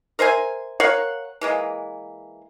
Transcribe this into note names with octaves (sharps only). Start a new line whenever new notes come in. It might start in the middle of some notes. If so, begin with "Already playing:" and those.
A#4 C5 E5 G#5
A#4 C#5 F5 F#5
E3 G#3 A#3